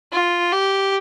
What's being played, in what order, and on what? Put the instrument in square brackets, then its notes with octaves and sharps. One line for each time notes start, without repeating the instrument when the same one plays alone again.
[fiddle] F4
G4